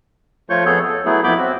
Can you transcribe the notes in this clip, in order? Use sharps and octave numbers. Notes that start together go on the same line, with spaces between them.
F3 A3 F4 C#5 C#6 G6
F2 B3 G#4 A4 C#5 G6
A4
F#3 A3 B3 E4 G#4
F2 B3 E4 B5 D6 G6
C4 F#4